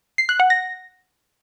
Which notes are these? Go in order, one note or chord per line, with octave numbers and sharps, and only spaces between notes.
C7
F#6
F#5
A#6